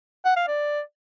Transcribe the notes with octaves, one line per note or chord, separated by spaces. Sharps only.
F#5
F5
D5